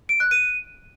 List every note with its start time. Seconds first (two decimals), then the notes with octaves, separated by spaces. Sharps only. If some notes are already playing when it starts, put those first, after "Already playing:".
0.09 D7
0.20 F#6
0.31 D#7